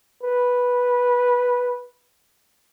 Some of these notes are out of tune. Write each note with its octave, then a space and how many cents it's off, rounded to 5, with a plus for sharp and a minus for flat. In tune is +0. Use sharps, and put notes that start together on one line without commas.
B4 -10